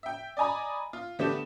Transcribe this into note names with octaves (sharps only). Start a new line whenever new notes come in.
E5 G5
D5 D#5 G#5 A#5 B5
F4
D3 A3 B3 G4 E7